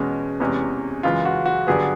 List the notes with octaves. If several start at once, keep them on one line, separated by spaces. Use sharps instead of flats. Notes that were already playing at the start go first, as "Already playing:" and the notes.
Already playing: E2 B2 G#3 C#4
E2 C3 E3 G#3 C#4
F#2 C#3 E3 G#3 F4
F#4
F#4
G2 D3 F#3 B3 G#4